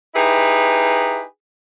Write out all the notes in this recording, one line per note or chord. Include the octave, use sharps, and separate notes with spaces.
D#4 E4 G4 G#4 B4